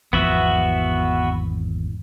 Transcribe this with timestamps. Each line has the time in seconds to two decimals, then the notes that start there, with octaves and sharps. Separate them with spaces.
0.13 G#1 E2 F3 B3 F#4 E5